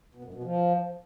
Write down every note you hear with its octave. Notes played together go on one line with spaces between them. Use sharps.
B2
F#2
B2
F3